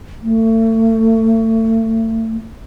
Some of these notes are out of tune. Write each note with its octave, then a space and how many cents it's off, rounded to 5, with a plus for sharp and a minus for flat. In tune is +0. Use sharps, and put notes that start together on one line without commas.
A3 +35